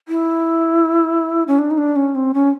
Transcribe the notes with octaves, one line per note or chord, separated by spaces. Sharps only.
E4
C#4
D4
D#4
D4
C#4
C4
C#4